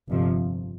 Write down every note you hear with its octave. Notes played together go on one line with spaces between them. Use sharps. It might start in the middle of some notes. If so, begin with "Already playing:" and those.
G1 F2 C3 F3